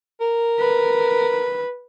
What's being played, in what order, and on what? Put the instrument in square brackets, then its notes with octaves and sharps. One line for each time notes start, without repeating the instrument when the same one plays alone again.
[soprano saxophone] A#4
[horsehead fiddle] B4